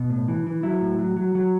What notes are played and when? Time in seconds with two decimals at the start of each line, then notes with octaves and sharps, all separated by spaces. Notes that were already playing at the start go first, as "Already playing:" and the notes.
Already playing: B2
0.10 A2
0.28 E3
0.47 E3
0.63 F#3 E4
0.81 A2
0.99 F#3
1.17 F#3
1.35 F#3